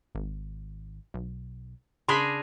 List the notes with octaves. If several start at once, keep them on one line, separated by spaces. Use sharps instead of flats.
G#1
B1
C#3 D4 G#4 A#4 B5 C6